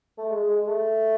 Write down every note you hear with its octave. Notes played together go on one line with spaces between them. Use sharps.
A3
G#3
G#3
G#3
A3